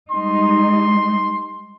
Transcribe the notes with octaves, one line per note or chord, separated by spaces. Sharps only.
G3 G#3 D#4 C6